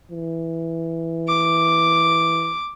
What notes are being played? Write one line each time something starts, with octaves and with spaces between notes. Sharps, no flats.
E3
D6